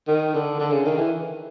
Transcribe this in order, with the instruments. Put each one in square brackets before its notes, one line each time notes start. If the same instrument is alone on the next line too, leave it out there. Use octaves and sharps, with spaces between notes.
[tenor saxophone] D#3
D3
D3
C#3
D#3
E3